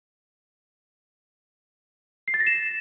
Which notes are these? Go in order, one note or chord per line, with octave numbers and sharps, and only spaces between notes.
C7
A6
A#6
E7